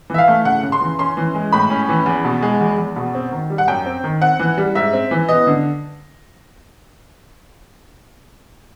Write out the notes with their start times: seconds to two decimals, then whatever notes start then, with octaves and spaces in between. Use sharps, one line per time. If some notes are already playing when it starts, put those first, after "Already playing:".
0.10 E3 E5
0.18 F5
0.28 A3
0.45 C#3 F#5
0.63 C#3
0.72 C6
0.81 E3
0.99 C#4 C6
1.17 E3
1.35 G#3
1.53 A2 B5
1.70 C#4
1.89 E3
2.06 E2
2.25 B2
2.42 G#3
2.61 E2
2.78 E2
2.96 B2
3.15 C4
3.32 D#3
3.50 G3
3.58 F#5
3.68 F#2 G5
3.86 C4
4.04 D#3
4.22 C4 F#5
4.40 E3
4.58 G3
4.75 G#2 E5
4.93 C4
5.11 E3
5.29 B3 D#5
5.47 D3